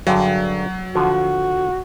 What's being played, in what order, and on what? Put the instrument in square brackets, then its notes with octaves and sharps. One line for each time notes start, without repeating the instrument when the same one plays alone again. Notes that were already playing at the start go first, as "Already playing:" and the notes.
[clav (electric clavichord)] G2 D3 G#4 [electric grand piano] F#3
[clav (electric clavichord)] D3 F3 [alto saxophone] F#4